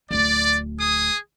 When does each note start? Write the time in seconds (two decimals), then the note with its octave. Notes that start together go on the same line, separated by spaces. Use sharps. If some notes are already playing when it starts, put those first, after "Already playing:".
0.11 D1 D2 D5
0.78 G#4 D#6